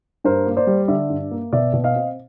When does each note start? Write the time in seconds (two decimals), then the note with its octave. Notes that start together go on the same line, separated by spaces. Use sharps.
0.24 G2 A#4 C5
0.47 A#3
0.57 C5 D5
0.67 G3
0.88 D3 D5 E5
1.10 G2
1.31 A#3
1.53 B2 D5 E5
1.73 B2
1.84 D#5 F5
1.95 C4